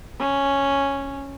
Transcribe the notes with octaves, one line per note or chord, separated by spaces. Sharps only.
C#4